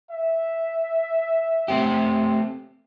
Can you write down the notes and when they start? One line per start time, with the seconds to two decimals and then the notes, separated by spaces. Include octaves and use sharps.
0.11 E5
1.68 A3 C4 G4